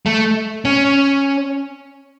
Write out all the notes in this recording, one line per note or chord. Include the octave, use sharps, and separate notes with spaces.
A3
C#4